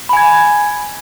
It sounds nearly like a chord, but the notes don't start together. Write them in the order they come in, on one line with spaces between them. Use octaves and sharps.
B5 G#5 G#6